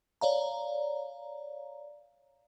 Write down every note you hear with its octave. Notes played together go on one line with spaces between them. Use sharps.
C#5 D5 F5 A#5